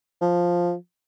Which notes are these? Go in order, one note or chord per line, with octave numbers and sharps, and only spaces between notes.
F3